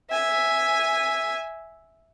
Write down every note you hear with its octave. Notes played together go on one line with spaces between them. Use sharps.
E5 G#5